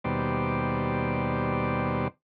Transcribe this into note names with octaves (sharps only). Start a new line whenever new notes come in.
D#2 B2 G3 C5 D5